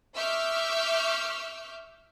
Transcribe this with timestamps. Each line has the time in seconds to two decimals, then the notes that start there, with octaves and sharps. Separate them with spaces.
0.15 E5 C#6 D6 E6 F6 G6